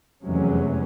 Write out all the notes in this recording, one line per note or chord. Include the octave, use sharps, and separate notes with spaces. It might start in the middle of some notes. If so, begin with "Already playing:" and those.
F1 E2 C3 F#3 G#3 C#4